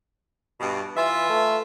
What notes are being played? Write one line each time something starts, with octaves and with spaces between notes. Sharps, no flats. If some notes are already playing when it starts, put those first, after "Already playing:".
G2 B2
E3 F4 B4 E5
A3